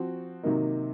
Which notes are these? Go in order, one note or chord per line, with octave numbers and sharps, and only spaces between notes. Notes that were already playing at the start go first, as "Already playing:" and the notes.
Already playing: F3 C4 F#4
C3 D#3 F#3 A#3 D#4